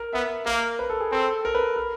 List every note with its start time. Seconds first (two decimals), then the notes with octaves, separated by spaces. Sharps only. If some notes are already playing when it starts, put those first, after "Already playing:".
Already playing: A#4
0.13 B3 E5
0.46 A#3 A#4
0.79 B4
0.90 A4
1.00 G#4
1.12 C4 A4
1.45 A#4
1.55 B4
1.76 A#4